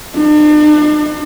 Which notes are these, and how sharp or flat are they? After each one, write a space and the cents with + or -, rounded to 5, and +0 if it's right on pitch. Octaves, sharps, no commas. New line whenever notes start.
D4 +45